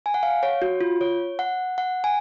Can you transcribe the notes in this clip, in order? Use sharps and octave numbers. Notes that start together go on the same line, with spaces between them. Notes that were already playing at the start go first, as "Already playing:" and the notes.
G#5
F#5
F5
C#5
F#4
F4
C#5
F#5
F#5
G#5